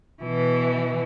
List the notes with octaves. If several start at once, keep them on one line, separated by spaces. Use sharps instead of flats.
B2 E3